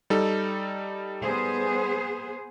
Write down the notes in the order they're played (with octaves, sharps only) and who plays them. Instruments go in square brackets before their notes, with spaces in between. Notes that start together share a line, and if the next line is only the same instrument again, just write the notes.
[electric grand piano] G3 D#4 A4
[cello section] B3 G#4 C5